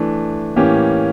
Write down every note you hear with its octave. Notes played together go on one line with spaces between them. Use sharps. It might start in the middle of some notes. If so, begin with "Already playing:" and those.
Already playing: E3 A3 D4
A2 E3 A#3 C#4 G4